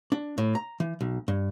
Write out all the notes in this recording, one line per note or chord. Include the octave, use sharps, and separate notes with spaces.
D4
A2
A#5
E3
B1
G2